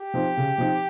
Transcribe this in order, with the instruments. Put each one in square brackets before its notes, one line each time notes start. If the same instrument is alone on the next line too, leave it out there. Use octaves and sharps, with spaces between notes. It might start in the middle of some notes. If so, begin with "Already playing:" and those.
Already playing: [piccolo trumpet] G4
[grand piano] F3 C4 D#4
C#3
F3 C4 D#4